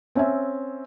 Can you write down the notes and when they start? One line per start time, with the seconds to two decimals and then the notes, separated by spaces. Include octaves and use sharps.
0.15 C4 C#4 C#5 E5 G#5